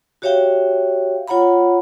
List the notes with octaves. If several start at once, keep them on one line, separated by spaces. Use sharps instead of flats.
F#4 G4 C#5 E5 F5 G5
F4 C#5 F#5 A#5 B5